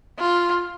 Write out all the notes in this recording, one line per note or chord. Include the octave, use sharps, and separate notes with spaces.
F4